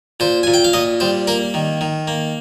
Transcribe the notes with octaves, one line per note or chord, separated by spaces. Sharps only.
A#2 C5
A#2 G#5
G5
F5
A#2 D#5
G3 C5
A#3 A#4
D#3
D#3
A#3